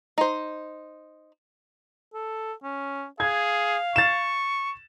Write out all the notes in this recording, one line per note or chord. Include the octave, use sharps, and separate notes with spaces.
D#4 C5
A4
C#4
G#4 F5 G#6
C#6 A6 E7